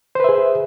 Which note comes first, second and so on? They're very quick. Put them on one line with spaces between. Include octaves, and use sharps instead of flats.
C5 B4 E5 G#4